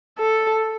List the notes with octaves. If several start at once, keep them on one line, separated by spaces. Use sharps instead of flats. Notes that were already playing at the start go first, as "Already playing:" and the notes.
A4